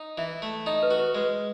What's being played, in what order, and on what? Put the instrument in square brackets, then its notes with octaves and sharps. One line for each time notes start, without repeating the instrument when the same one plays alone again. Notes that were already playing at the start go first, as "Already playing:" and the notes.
Already playing: [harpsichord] D#4
[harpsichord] E3 [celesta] E5
[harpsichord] A3
[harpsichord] D#4 [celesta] D#5
[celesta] B4
[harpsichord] F#4
[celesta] B4
[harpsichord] G#3 [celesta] B4